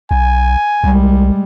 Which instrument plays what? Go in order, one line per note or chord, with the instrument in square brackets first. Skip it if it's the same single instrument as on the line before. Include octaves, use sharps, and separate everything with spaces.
[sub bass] B1 [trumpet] G#5
[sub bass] C2 [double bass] G3 G#3